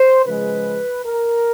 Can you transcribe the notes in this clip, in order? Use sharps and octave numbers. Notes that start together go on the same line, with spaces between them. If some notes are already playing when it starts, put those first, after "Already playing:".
Already playing: C5
C#3 F3 G#3 B4
A#4